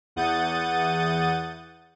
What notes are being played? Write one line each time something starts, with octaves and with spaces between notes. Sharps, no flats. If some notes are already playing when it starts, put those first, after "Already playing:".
E2 F#5 D#6 G6 A6 D#7